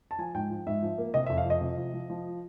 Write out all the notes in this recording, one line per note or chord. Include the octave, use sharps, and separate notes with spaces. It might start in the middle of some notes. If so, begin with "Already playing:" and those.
A5
F3 G#5
G#2 G5
F3
G#2 E5
F3
A#3
C3 D#5
F2 E5
F5
F3 D#5
C3
F3
F3
F3